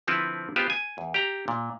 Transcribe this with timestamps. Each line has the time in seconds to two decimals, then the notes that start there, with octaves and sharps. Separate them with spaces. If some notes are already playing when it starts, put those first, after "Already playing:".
0.07 D3 F3 C4 E4 A4 B4
0.56 B3 F4 G4 G#4 C5
0.70 G#5
0.98 E2
1.14 G4 F5 A#5
1.48 A#2